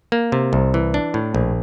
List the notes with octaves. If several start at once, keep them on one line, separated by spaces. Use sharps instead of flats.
A#3
C3
C2
E3
D4
A2
A#1